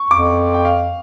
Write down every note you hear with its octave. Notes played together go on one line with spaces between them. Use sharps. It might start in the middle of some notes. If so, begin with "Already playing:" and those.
Already playing: C#6
F2 D6
G5
F5